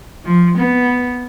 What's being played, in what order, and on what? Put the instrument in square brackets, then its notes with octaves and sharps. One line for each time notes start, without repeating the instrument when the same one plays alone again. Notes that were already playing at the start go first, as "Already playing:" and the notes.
[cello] F3
B3